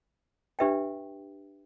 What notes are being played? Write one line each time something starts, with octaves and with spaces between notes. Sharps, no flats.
D4 G4 B4 E5 G5